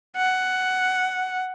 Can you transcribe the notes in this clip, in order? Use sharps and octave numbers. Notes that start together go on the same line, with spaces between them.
F#5